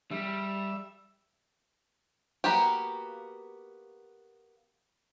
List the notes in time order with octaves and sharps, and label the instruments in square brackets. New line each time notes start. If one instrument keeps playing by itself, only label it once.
[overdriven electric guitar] G3 [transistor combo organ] E5
[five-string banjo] A#3 B3 F#4 G4